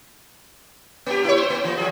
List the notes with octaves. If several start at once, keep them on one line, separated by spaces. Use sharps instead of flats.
A#3 G4
E4 C#5
C5
A#3
E3
F3 G#4